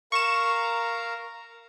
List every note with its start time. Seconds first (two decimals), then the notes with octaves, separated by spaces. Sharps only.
0.12 A#4 F5 A#5 C#6 E7